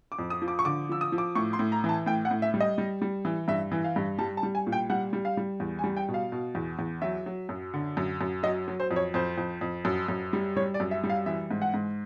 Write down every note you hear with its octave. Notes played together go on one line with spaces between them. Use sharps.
D6
F2
D#6
F3
D6
C#6
D3 D6
F3 E6
D#6
F3
D6
A2 C#6
C6
A2
A#5
E3
A5
A2 G5
F#5
A2
E5
G3
D#5
G3
G3
E3
G2 E5
E3
F5
G2
G3 A5
A5
G3
G#5
A#2
G5
G3 F#5
G3
F5
G3
E2
G#5
G3
G5
B2
F5
B2
E2
E2
F#3 E5
F#3
F#2
D3
F#2
F#2
F#3 D#5
F#3
C5
F2
C#5
F2 C5
F2
F2
F#2
F#2
G3
G3 C#5
D5
F#2
E5
G3
F5
E3 E5
G#2
F#5
G#2